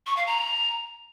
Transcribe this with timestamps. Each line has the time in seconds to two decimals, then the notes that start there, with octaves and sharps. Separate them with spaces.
0.07 C#6
0.17 F5
0.26 A#5